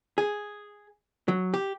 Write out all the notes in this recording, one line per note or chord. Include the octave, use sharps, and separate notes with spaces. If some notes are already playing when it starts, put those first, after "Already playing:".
G#4
F#3
G4